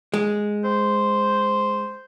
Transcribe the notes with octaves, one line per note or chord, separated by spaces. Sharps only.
G#3
C5